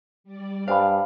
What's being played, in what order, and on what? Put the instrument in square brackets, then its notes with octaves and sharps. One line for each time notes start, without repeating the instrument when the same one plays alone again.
[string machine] G3 D5
[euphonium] G2 [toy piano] C5 G#5 B5 [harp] F5